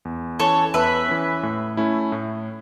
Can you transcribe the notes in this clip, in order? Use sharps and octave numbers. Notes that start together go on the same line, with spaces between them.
E2
E3 C#4 A4 C#5
E2 B4 E5
E3 C#4
A2
A3 C#4 E4
A2